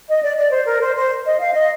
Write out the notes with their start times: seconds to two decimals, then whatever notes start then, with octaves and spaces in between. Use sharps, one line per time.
0.09 D#5
0.22 D5
0.38 D5
0.52 C5
0.66 A#4
0.81 C5
0.96 C5
1.26 D#5
1.39 F5
1.55 D#5